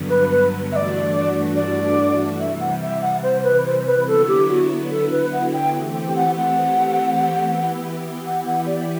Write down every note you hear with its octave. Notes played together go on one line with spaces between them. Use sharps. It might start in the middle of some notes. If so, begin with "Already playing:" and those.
Already playing: G2 D3 F#3 B3
B4
B4
G2 E3 A3 D4 F#4 D5 E5
D5
C3 E3 G3 E5
F#5
E5
F#5
C5
B4
C5
B4
D3 F#3 B3 E4 A4
G4
F#4
A4
B4
F#5
G5
E3 A3 C4 G4
G5
F#5
F#5
E3 B3 E4 G4
F#5
F#5
D5